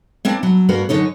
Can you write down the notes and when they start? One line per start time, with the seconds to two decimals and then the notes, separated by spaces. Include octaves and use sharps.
0.25 A#3 C4 D4
0.43 F#3
0.69 G2 A#3 F#4 A#4
0.89 F#2 D3 D#4 C#5